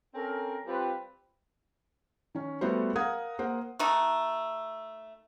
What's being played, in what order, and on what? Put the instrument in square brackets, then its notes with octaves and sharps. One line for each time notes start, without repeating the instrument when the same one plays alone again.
[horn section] C4 C#4 A4 A#4
G3 C4 F4 B4
[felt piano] D#3 C#4
G3 A3 B3 F#4 C5
A#4 F5 F#5 A#5 D#6 G#6
A#3 C5 F#5
[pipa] A3 D#4 F#4